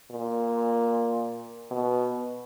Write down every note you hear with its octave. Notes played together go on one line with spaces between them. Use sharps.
A#2
B2